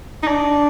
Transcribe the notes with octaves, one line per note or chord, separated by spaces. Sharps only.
D#4
D4